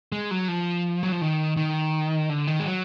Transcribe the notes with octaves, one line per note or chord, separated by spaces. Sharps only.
G#3
F#3
F3
F#3
F3
D#3
D#3
D3
D#3
G#3
F#3